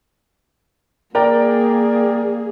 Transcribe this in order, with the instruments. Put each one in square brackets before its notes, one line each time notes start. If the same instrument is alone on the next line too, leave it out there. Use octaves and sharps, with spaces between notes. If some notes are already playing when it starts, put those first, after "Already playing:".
[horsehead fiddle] A#3 G#4 [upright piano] A#4 D5 G5